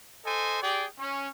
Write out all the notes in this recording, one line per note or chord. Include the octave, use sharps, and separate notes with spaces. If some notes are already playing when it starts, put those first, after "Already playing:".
A4 C5 D#5 G#5
G4 G#4 D5 G5
C#4